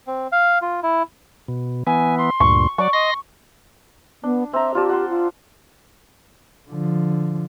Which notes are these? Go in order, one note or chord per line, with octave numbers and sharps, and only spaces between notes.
C4
F5
F4
E4
B2
E3 B3 G#5
C6
D2 G2 A#2 C#6
F#3 D5 C#6
D#5 C6 A#6
B3 D4
C4 E5 A#5
F4 G4 D5 A5
F#5 C6
F4
D3 F3